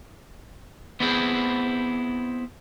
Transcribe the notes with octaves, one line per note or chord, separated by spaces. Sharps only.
B3 C4 E4 G#4 C5